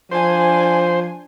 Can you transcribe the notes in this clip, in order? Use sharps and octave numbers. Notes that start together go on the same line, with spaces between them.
F3 D4 C5 G#5